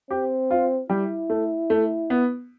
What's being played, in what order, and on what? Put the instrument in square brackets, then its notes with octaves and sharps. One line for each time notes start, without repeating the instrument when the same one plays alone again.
[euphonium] C4 [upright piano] G4
[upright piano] F4
[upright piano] G3 [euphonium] E4
[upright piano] A3
A3
B3